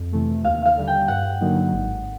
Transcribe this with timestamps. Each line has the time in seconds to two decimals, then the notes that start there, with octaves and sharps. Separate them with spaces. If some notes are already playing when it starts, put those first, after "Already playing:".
Already playing: F2
0.13 C3 E3 A3
0.45 D#2 F5
0.65 F5
0.77 D3 G3
0.87 G5
1.08 G2 F#5
1.41 D3 F#3 A#3 D#4
1.73 G#1